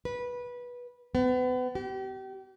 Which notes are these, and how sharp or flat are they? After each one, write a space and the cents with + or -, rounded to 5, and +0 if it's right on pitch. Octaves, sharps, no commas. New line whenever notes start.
B4 -15
B3 +35
G4 -35